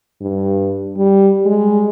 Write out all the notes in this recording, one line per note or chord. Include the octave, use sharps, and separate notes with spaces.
G2
G3
G#3